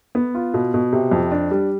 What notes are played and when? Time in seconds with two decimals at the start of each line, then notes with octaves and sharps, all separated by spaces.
0.15 B3
0.35 F4
0.54 B2
0.74 B2
0.92 C3
1.11 F2
1.31 D4
1.51 G3